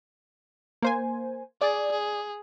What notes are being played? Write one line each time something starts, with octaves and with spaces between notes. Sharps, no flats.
A#3 C5 G#5
G#4 D5
G#4